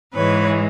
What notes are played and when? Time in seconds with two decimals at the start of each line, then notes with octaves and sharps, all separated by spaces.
0.14 G#2 E3 G#3 B4 C#5